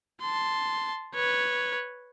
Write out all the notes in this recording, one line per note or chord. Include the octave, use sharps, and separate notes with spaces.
A5 C6
B4 C#5